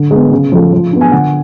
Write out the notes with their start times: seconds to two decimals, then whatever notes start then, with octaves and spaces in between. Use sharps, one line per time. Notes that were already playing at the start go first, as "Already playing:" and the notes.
Already playing: D3
0.11 G#3 B3
0.32 C#3
0.52 F3 A3
0.73 F3
0.93 B3 D4
1.01 G#5
1.12 D3 F#5